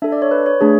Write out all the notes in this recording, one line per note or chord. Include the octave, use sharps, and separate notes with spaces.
D4 A4 E5
D5
C#5
B4
C#5
A3 D4 G#4